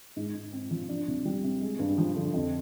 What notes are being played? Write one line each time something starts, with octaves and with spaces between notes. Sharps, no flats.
G#2
G#2
C4
F3
D4
C2
G3
C3
G#3
G2
F3
D3
F2